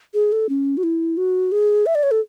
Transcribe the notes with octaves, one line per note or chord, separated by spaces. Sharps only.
G#4
A4
C#4
F#4
E4
F#4
G#4
E5
D5
C#5
A4